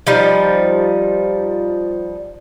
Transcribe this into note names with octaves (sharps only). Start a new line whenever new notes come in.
F3 G3 D#4